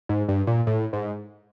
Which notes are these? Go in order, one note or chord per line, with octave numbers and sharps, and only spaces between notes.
G#2
G2
A#2
A2
G#2